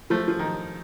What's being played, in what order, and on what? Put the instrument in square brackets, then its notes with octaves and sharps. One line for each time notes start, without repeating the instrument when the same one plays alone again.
[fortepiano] F3 A3
F3
D#3